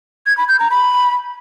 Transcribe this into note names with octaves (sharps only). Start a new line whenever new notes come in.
G#6
B5
G6
A#5
B5